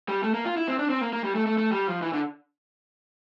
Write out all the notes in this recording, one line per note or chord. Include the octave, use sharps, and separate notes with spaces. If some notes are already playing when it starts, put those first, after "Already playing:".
G3
A3
A#3
F4
E4
C4
D4
C4
A#3
A#3
G3
A3
A3
A3
G3
F3
E3
D3